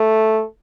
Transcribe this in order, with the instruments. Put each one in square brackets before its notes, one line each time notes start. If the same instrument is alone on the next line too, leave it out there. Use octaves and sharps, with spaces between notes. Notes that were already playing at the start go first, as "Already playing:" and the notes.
Already playing: [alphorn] A3